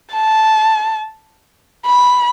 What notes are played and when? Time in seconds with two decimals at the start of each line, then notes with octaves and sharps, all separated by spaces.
0.13 A5
1.86 B5